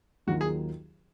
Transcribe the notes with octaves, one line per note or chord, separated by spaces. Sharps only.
D#2 D#3 F#3 A#3 F4 F#4
G#4